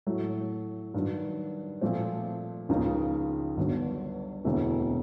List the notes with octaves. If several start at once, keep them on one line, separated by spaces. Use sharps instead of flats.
A2 F#3 A3
G2 D#3 F#3
A#2 F3 A3 C4
C#2 C#3 F3 A#3 D#4
G1 G2 D3 F#3
E1 D2 C3 E3 A3